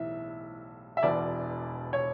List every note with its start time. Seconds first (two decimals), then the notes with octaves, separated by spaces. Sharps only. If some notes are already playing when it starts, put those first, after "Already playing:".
Already playing: B1 A2 E3 E5
0.97 E5
1.03 E1 E2 B2 D5
1.93 C#5